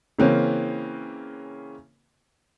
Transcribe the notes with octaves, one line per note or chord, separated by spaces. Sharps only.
C#3 E3 A#3 C4 C#4